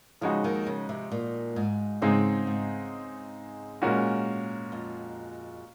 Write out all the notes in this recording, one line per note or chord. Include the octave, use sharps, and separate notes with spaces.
C#3 F3 G#3 D#4 F#4
D#2 D#3
C#3
C3
A#2
G#2
G#2 C#3 G#3 C4 D#4 G#4
G#2
A#2 G#3 C#4 F#4 A#4
F2